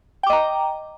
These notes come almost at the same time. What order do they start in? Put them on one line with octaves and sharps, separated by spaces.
G5 D6 D#5 A#5